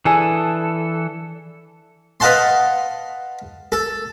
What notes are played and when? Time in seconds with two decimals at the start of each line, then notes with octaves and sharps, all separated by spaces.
0.05 E3 D4 G#4 A4
2.20 B4 D#5 F5 F#5 A5 C6
3.72 A4